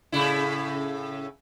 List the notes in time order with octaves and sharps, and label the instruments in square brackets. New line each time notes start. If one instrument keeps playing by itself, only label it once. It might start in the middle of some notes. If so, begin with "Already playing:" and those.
[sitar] A2 C#3 E4